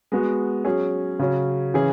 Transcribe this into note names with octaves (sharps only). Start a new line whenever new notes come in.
G#3 B3 F#4
F#3 C#4 G#4
C#3 F#3 C#4
C#3 E3 C#4 G#4